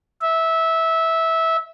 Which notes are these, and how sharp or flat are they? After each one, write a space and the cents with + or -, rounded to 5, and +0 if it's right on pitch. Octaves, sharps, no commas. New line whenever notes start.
E5 -15